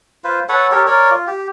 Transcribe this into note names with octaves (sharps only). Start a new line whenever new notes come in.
F4 B4 C5
A4 B4 C#5 F#5
G4 A4 A#4 C#5
A#4 C#5 D5
F4
G4